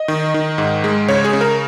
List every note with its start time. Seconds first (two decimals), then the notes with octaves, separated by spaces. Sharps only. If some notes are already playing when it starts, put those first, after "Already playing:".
Already playing: D#5
0.08 D#3
0.34 D#3
0.58 G#2
0.84 G#3
1.08 C#3 C#5
1.24 G#4
1.33 C#3
1.41 A#4